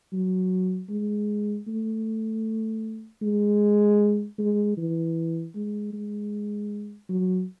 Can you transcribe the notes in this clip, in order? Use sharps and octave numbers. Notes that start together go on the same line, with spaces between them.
F#3
G#3
A3
G#3
G#3
E3
G#3
G#3
F#3